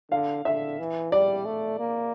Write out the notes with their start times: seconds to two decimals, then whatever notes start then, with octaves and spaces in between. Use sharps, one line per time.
0.11 D3 F5
0.45 D3 E5
0.79 E3
1.12 G3 D5
1.45 A3
1.79 A#3